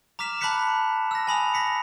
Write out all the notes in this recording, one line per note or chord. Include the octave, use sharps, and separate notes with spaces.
A#5 D6 F6 B6 E7 F7
A5 B5 D6 F#6 B6 C#7
E6 A#6
G#5 B5 D#6 F7
A#6 B6 C#7